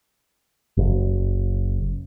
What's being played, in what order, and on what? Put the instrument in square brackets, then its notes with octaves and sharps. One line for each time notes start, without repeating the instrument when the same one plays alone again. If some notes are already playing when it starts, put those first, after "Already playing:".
[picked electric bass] F#1